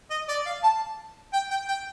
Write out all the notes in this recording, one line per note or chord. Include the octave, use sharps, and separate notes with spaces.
D#5
D5
F5
A5
G5
G5
G5